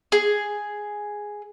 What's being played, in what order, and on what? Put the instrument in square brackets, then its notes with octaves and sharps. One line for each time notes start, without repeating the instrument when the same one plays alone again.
[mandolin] G#4